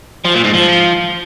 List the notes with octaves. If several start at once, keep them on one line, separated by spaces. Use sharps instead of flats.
F3
A#2
G#2
F3